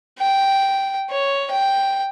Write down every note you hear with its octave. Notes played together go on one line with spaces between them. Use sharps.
G5
C#5
G5